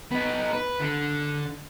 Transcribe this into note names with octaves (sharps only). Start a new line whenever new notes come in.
B3 D#4
B4
D3